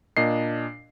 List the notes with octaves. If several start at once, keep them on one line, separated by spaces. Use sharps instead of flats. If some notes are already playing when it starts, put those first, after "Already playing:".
A#2 D4 D#5 C7